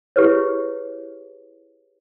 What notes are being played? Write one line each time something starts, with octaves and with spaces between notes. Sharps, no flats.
E4 G4 G#4 B4 C#5